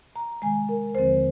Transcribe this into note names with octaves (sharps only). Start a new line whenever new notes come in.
A#5
C3 D#3 G#3 G#5
A#4
D#2 D3 F3 G#3 C4 C5